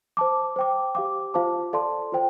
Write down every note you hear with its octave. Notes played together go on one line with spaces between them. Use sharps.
C5 A5 D6
C5 G5 D6
G4 F5 D6
F4 C5 F5 A5 D6
A4 D5 F5 A5 C6
F4 C5 G5